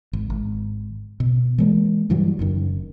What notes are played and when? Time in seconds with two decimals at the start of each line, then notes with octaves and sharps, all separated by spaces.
0.13 G#1
0.30 G#1
1.20 B2
1.58 E3 G#3 A#3
2.10 G2 E3 F#3 G3
2.39 F#1 F#2 D#3